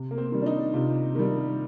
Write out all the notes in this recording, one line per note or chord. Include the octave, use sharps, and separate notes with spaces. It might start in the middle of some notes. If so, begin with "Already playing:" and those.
Already playing: C3
A#3
C4
D#3 G3
D4
D#4
C3 F4
D#3 G3